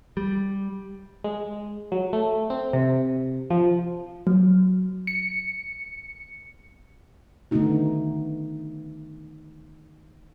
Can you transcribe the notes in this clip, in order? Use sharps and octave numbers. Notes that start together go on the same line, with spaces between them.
G3
G#3
F#3
A3
C4
C3
F3
F#3
C#7
D3 D#3 A3 B3 D#4 F#4